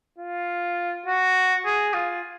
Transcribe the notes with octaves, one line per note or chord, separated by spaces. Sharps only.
F4
F#4
G#4
F4